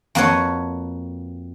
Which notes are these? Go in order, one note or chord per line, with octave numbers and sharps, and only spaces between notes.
F2 A#3 F#4 A4 B4 C#5